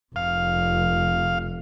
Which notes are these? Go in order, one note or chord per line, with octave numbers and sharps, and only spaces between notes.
F1 F5